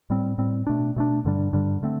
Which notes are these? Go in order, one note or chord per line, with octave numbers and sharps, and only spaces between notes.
A2 G3 C4
A2 G3 C4
B2 A3 D4
B2 A3 D4
G2 D3 G3 D4
G2 D3 G3 D4
D3 A3 C4